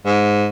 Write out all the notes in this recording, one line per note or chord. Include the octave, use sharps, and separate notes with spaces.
G#2